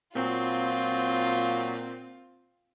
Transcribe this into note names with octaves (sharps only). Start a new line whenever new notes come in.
A#2 F#3 C4 F4